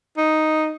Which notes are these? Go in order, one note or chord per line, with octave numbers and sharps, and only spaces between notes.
D#4